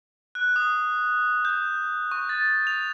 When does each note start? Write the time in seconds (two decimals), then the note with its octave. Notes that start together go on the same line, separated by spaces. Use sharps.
0.35 F#6
0.56 D#6
1.45 G6
2.12 C#6
2.29 A6
2.67 F7